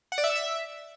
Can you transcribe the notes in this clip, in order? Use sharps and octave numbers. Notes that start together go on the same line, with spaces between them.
F#5
D5
E5
E6
E5